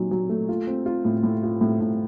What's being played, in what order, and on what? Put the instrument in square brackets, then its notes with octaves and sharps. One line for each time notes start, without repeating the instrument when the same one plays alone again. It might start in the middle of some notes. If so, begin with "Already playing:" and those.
Already playing: [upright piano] A#2 F#3 D#4
F#3
A3
F4
C4
F4
A2
A2
F4
A2
A2